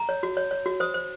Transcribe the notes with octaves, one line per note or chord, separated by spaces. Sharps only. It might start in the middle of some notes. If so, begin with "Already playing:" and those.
Already playing: A#5
C#5
F#4
C#5
C#5
F#4
C5 D#6
C5